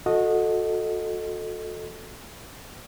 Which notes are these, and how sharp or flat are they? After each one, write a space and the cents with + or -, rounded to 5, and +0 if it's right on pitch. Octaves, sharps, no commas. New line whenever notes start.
F#4 -25 A4 +0 D#5 +0